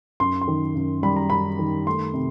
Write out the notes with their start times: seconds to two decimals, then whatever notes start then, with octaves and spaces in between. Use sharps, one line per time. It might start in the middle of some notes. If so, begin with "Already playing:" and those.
0.20 F#2 C6
0.41 C6
0.48 D#3
0.75 F#2
1.03 G3 B5
1.16 A#5
1.30 F#2 B5
1.59 D#3
1.87 A3 C6
2.14 C3